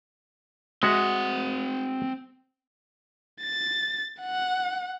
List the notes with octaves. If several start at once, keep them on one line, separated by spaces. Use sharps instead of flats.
G#3 C4 F#4 E5 F#5
A6
F#5